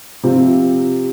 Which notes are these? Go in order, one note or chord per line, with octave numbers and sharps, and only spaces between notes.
C3 F3 C4 F4